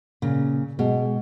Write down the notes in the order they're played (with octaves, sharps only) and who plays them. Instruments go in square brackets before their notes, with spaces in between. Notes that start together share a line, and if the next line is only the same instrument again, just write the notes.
[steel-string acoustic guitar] A#2 C#3
[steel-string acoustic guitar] B2 [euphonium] G#3